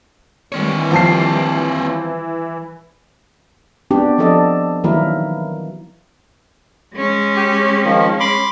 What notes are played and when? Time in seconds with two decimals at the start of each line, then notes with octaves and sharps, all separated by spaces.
0.52 D#3 E3 G3 C4 C#5
0.91 F3 A5 C7
3.91 B3 C4 D4 F#4 G4
4.18 F3 C4 D4 A4 D5 D#5
4.84 D#3 E3 F#3 A#3 E4 A#4
6.96 G#3 C#4
7.36 G4
7.84 D#3 F3
8.20 B5 C6 D6